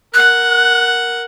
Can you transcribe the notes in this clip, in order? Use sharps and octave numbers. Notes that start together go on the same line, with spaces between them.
A#4 F#5 F#6